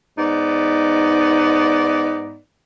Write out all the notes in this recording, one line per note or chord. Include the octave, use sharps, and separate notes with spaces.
G#2 B3 D#4 D5